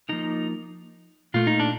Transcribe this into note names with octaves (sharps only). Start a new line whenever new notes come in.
D3 F3 A#3 D#4
A#2 A3 F4
D#4
D4